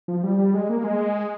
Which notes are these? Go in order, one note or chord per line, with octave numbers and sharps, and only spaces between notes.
F3
G3
G3
G#3
A#3
G#3